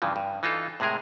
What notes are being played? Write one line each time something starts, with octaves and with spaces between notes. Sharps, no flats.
G2 C#3 E3 F3
G2
E3 D#4 F4 A4
A2 C3 G#3 G#4 A#4